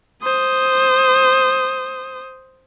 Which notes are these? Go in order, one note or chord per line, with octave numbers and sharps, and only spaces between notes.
C5 D#6